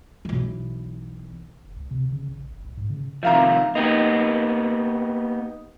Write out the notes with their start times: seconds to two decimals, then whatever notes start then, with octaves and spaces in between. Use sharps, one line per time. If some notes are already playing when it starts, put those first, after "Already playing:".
0.25 B1 E3
1.65 F#1
1.76 C#2
1.91 C3
2.12 C#3
2.28 A#1
2.51 F#1
2.65 B1
2.77 G#2
2.90 C#3
3.23 C3 D#3 F3 E5 F5 A#5
3.75 A#3 B3 D#4 G4